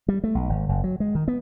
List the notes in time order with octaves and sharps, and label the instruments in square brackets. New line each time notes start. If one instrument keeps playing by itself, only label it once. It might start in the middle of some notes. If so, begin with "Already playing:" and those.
[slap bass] G3
A3
B1
G#1
F#1
F#3
G#3
D#3
B3